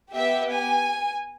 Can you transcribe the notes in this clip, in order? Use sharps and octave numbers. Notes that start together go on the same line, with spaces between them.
B3 G4 E5
G#5